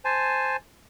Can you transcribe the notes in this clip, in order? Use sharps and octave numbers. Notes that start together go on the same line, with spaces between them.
C5 G#5 A5